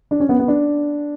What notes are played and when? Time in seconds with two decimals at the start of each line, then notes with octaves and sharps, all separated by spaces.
0.11 D4
0.20 C#4
0.29 B3
0.40 B3
0.48 D4